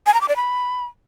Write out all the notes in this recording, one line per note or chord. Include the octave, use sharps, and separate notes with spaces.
G#5
A#5
D6
D5
B5